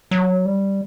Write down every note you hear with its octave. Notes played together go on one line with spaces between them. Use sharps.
F#3
G3